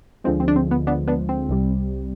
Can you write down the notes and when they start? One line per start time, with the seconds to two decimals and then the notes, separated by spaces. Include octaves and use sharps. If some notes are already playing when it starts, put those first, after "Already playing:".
0.24 D2 D3 F3 G#3 C4
0.40 C4
0.48 D4
0.56 C4
0.71 B3
0.87 B3 D4
1.08 B3 D4
1.29 C4
1.49 C2 C3 G3